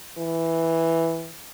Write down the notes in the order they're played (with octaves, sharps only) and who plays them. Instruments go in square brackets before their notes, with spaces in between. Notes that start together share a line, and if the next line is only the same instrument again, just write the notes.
[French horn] E3